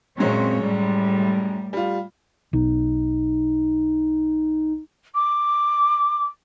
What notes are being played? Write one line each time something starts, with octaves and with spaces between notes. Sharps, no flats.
F#2 A#2 G#3 C4 C#5
A2 G3
G3 F4
B1 D#4
D6